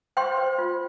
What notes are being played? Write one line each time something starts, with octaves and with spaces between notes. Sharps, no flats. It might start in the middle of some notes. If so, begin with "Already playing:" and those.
C5 G5 C6
C5
F4